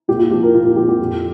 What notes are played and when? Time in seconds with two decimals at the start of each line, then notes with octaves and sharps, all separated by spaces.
0.08 A#2 G4
0.19 F4
0.31 F3 G4
0.43 A#4
0.53 A#2 F4
0.65 F4
0.76 F3 G4
0.88 G4
0.99 F2